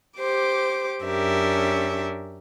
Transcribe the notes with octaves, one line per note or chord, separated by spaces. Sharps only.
G4 C5 D6
F#2 C#4 D4 G4 A#4 E5